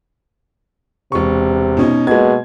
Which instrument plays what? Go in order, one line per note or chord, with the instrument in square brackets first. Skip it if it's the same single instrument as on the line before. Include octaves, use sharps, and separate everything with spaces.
[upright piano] E1 C#6 [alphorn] C3
[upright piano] B2 C#4 D#4
[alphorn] B2 [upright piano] G#3 A#3 G#6